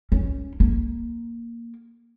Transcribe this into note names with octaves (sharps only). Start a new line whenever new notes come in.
C#4
A#3